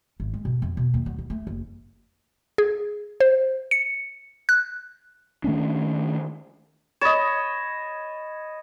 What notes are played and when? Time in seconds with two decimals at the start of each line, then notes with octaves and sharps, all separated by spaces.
0.20 G#1
0.34 G#3
0.45 B2
0.62 F2
0.77 B2
0.94 D#2
1.06 F#3
1.18 E4
1.30 A3
1.47 F#1
2.58 G#4
3.20 C5
3.71 C#7
4.49 F#6
5.44 D#3 A3 C#4 D4
7.01 C#5 D#5 B5 A6 E7